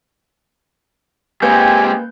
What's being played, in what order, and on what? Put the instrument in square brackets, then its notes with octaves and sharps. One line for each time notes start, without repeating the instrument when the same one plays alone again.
[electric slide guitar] G#3 C4 C#4 [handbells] A#3 B4 G6 [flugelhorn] G4 [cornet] G#5